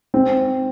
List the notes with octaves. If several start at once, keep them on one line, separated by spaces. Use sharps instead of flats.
C4